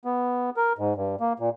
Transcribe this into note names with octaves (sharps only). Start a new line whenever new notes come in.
B3
A#4
G#2
G2
A#3
A#2